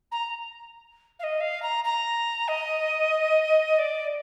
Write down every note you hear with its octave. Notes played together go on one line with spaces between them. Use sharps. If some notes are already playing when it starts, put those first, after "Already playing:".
A#5
F5
D#5
F5
A#5
A#5
D#5
D5